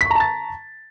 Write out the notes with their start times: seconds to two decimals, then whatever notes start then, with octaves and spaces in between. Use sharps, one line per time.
0.01 B6
0.06 C#6
0.10 A#5
0.15 A5
0.20 A6